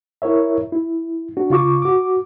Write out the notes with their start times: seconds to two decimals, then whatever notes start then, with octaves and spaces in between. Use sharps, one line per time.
0.22 E4 A#4 C#5 E5
0.72 E4
1.37 D4 F#4
1.50 C#3 F4 C#6 D6
1.82 F#4 D6